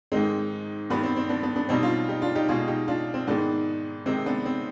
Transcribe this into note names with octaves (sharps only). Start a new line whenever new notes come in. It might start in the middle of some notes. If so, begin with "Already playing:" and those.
G#2 D#3 G#3 C4 D#4
G2 D#3 G3 B3 D4
C4
C4
B3 D4
B3 D4
B3 D4
B2 G3 C4 D#4
D4 F4
D#4 G4
D4 F4
D#4 G4
B2 G#3 F4 G#4
D#4 G4
D4 F4
C4
G#2 D#3 G#3 B3 D4
C3 D#3 G#3 C4 D#4
B3 D4
C4